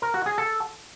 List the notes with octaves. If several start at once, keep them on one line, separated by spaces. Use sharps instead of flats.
A#4
F#4
G#4
A4